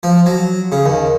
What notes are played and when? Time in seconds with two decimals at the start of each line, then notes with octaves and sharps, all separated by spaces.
0.03 F3
0.26 F#3
0.72 C#3
0.86 D#2